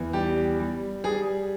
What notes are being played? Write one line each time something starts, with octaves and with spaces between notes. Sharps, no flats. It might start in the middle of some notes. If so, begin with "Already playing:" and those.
Already playing: E2
G3 G4
G3
G3 G#4